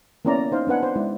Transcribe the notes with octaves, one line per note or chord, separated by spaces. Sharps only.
A#3 B3 C#4 E4 D5 A#5
D#4 C5 F5
B3 D4 B4 F#5 G#5
C5
G#3 E4 D5